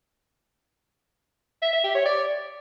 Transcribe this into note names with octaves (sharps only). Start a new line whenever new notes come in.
E5
E5
G4
C#5
D5